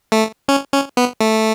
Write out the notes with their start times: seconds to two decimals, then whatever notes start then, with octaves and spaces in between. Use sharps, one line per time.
0.12 A3
0.49 C#4
0.72 C#4
0.97 B3
1.20 A3